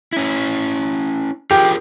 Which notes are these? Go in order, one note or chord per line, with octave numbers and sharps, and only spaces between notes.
C#4 E4
F4 G4 G#4 A#4